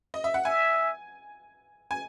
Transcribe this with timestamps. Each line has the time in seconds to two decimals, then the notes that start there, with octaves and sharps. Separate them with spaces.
0.14 D#5
0.24 E5
0.34 F#5
0.45 E5 G#5
1.91 G#5